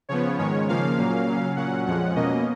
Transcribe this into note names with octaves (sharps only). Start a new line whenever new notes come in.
C#3 F3 B3 C#5
G#2 D#3 G#3 C#4 C#5
C#3 F3 A#3 C#4 F5
A#2 F#3 A#3 C#4
C#3 F#3 C#4
A#2 F#3 C#4 F#5
F2 F3 G#3 C#4 F#5
B2 A#3 C#4 D#5